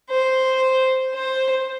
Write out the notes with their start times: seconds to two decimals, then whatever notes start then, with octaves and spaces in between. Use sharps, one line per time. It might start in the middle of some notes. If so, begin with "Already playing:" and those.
0.10 C5
1.14 C5